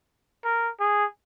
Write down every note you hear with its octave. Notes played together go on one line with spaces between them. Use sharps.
A#4
G#4